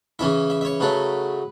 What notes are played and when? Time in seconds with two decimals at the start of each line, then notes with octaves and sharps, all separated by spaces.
0.19 C#3 E3 C#4 E4 E5
0.50 E5
0.61 E5
0.65 C#5
0.80 C#3 F#3 A3 B4